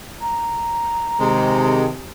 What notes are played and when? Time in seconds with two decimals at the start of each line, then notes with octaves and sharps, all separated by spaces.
0.21 A#5
1.20 C3 D#3 G#3